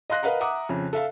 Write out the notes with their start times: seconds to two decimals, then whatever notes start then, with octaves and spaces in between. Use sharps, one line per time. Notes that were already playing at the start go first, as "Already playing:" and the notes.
0.10 D#5 F5 C6 F#6 A#6
0.23 A#4 B4 D#5 F5 F#5 A#5
0.41 E5 F#5 A#5 D6 D#6
0.69 F2 C#3
0.93 A4 E5 F5